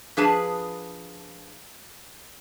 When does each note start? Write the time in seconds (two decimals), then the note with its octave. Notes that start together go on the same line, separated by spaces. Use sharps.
0.17 F3 D4 G#4 B4 A5